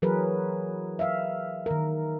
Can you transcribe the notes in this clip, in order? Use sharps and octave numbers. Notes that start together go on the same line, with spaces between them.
E3 F#3 G#4 A#4 B4
E5 F5
D#3 A#4